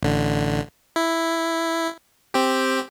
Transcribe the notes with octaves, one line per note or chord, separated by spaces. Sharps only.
A1 D3
E4
C4 G4